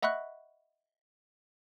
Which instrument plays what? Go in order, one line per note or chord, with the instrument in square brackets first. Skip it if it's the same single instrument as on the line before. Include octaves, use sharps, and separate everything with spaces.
[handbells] D#5 E5 F#5 B5 C#6 F#6